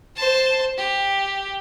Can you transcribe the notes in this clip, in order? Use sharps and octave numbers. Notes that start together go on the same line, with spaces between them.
C5 A5
G4